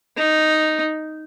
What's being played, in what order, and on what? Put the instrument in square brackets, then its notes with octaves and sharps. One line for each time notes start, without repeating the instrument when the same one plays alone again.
[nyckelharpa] D#4